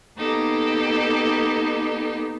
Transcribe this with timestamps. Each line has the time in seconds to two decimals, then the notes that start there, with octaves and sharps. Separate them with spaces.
0.18 A#3 B3 D#4 G4 A4